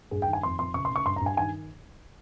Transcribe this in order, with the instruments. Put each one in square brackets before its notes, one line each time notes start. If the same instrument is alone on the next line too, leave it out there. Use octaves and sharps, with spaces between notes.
[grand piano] G2 G#4
G5
D#3
G#5
F2 C6
F2 C6
C#3 C#6
C6
C#3
C#6
G2 C6
A#5
G2
G#5
D#3 G#5